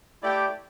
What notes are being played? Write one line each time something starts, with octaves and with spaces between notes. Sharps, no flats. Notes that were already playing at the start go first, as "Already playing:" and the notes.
A3 E4 G4 D5 G5